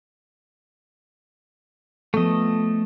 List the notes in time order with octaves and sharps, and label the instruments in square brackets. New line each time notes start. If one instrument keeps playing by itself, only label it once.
[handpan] F3 B3 A4 [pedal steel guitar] A3 D#5